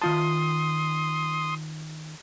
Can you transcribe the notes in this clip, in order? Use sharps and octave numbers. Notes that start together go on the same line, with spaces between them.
D#3 F4 A5 C6 D#6